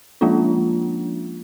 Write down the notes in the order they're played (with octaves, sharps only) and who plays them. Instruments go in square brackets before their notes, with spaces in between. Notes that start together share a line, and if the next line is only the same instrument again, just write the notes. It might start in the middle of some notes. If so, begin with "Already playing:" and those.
[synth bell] F3 G#3 A#3 C#4 D4 F4